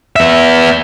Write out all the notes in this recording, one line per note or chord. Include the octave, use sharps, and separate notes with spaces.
B3 E5